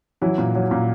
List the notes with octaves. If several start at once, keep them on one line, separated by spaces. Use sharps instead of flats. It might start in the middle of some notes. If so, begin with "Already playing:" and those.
E3 F#3 E4
A#2
F#3
A#2